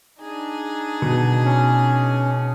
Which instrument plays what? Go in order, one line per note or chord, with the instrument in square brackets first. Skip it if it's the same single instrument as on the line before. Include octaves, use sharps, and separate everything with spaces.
[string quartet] D4 D#4 G#4
[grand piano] B2
[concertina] C#4